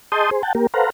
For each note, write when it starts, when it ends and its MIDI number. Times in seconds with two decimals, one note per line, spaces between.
0.12 0.30 68
0.12 0.30 75
0.12 0.30 81
0.12 0.30 84
0.12 0.30 87
0.12 0.30 91
0.31 0.42 68
0.31 0.42 72
0.43 0.53 78
0.43 0.53 79
0.43 0.53 81
0.55 0.67 58
0.55 0.67 67
0.55 0.67 70
0.74 0.90 69
0.74 0.90 71
0.74 0.90 72
0.74 0.90 77
0.74 0.90 78
0.74 0.90 82